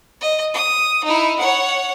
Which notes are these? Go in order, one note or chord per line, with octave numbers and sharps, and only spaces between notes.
D#5
D#6
D#4 E4
C#5 F#5